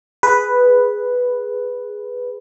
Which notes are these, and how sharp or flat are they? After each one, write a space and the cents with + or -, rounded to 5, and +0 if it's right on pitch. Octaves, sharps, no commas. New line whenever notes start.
G#4 +0 B4 +0